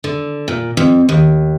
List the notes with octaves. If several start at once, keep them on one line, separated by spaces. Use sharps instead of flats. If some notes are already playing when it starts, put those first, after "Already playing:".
D3
A#2
F2
D#2